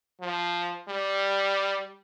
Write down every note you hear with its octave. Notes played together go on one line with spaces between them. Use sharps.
F3
G3